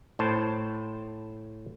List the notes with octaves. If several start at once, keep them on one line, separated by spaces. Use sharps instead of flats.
A2 C5 A5